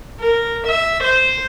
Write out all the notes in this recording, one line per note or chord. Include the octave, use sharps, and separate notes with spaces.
A#4
E5
C5